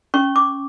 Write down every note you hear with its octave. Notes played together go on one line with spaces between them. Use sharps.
C#4 C#6
D6